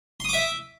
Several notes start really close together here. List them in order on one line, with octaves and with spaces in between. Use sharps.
C6 D#6 D6 E5